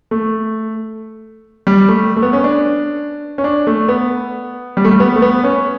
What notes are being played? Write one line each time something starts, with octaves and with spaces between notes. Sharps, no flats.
A3
G3
A3
A3
B3
C#4
D4
C#4
D4
A3
B3
G3
A3
G3
B3
A3
B3
C#4